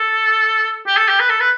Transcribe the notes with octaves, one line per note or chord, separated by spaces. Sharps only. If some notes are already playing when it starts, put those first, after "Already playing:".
Already playing: A4
G4
A4
G4
B4
A4
B4